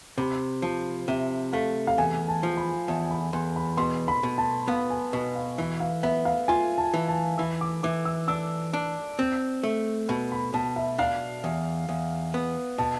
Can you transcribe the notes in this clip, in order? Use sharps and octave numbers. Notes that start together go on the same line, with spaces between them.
C3 B5
F3 A5
C3 E5
A3 F5
F5
E2 G#5
A5
F3
B5
E2 A5
B5
E2 C6
B5
B2 C6
B5
B2
A5
B3 F5
G#5
B2 A5
F5
E3 E5
F5
B3 E5
F5
F4 G#5
A5
E3
A5
E3 E6
D6
E3 D6
E6
D4 E6
D4
C4
A3
B2 B5
B5
B2 A5
E5
D4 F5
E2
E2
B3
B2 A5